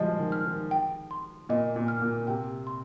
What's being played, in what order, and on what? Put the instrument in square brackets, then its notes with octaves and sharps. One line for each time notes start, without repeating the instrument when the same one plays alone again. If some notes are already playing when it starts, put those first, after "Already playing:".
Already playing: [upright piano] F3 G3 G#3 [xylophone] D#5
[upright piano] D#3
[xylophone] F6
[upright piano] D#3
[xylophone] G5
C6
[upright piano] A#2 [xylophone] D#5
[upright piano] A#2
[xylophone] F6
[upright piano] A#2
[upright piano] C3 [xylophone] G5
[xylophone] C6